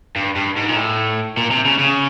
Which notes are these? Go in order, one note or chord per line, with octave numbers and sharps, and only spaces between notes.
G2
G2
G#2
A#2
A2
A#2
C3
C#3
C#3